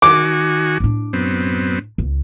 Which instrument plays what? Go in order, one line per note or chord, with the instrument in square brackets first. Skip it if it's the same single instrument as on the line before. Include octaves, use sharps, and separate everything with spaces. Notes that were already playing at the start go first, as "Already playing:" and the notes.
[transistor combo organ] D#3 F#4 G#5 [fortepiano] D6
[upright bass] A2 D4
[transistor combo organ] F#2 B3 C4
[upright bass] C#2